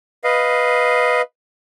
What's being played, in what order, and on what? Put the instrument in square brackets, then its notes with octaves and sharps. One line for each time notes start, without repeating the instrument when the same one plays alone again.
[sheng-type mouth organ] B4 D#5 F5